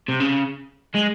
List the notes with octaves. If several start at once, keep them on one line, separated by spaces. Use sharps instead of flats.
C3
C#3
G#3